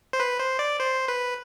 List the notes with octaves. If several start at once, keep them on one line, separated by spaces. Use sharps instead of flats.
C5
B4
C5
D5
C5
B4